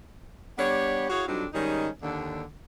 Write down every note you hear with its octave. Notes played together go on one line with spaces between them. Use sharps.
G3 B3 D4 G4 C#5
E4 F#4 G#4 C#5 F5
F2 F#3 G3 C4 D4 D#4
G#2 D#3 G3 C#4 D#4
D#2 D3 D4